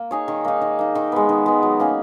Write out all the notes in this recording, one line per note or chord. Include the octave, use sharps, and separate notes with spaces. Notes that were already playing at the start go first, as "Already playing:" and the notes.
Already playing: A#3
D#4 G#4 C#5
D#3
A#3 D#4
D#3
A#3 D#4
D#3
G#3 B3
D#3
G#3 B3
F#3
A#3 C#4 G#4